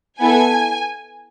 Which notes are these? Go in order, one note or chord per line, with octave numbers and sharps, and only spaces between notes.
B3 E4 A4 G#5